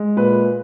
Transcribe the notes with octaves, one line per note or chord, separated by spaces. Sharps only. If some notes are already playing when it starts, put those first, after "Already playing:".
Already playing: G#3
A#2 B4